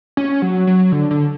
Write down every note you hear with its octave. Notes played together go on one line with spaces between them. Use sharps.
C#4
F#3
F#3
D3
D3